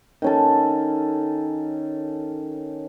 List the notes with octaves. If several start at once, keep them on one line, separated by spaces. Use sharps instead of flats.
D#3 C#4 A4